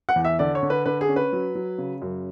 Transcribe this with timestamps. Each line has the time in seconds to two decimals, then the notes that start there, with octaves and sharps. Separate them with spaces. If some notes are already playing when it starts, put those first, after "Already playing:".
0.09 F#5
0.16 E2
0.24 E5
0.39 D3 D5
0.55 C#5
0.63 D3
0.70 B4
0.86 D3 B4
1.01 G#4
1.09 C#4
1.16 B4
1.33 F#3
1.55 F#3
1.78 C#3
2.02 F#2